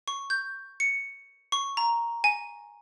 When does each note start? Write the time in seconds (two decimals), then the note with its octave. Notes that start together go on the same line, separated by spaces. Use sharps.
0.08 C#6
0.30 G6
0.80 C#7
1.52 C#6
1.77 A#5
2.24 G#5